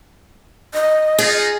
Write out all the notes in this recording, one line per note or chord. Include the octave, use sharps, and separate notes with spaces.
D#5
D#4 F4 G#4